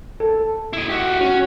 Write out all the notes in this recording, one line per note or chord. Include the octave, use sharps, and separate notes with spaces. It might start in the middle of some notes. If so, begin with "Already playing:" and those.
A4
E4 D#5
F#4 G4
C#4 F#4